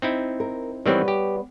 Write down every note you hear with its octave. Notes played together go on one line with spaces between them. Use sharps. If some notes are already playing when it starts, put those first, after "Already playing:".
C4 D#4 E4
A#4
D#3 E3 G3 B3 C4 C#5
G4